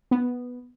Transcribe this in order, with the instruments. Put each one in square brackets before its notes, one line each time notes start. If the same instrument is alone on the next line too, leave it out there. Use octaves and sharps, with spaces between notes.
[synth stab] B3